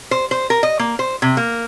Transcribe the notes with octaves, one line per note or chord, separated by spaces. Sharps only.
C5
C5
A#4
D#5
A#3
C5
C3
A#3